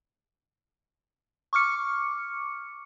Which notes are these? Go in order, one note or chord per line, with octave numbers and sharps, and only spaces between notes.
C#6 D6 F6 C#7